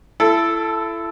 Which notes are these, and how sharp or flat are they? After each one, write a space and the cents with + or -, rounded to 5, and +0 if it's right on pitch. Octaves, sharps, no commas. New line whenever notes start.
E4 +30 A4 +0